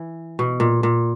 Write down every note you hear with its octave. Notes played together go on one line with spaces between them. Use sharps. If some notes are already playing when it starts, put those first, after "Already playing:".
Already playing: E3
B2
A#2
A#2